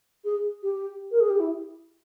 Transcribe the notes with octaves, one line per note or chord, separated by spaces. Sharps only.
G#4
G4
A#4
G#4
G4
E4